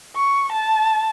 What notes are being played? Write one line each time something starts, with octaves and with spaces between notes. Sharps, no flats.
C#6
A5